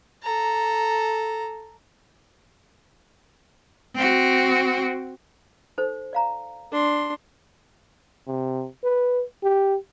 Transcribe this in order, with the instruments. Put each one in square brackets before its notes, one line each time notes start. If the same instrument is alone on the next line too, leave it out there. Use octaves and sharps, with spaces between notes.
[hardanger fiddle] A4 A#5
[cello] C4 F#4
[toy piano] D#4 A4 C5
D5 F5 A#5
[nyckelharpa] D4 C6
[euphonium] C3
B4
G4